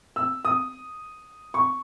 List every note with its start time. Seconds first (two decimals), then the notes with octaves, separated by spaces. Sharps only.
0.16 E6
0.45 D#6
1.54 C#6